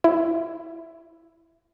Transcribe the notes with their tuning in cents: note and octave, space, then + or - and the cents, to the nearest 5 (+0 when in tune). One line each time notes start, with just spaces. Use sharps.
E4 +5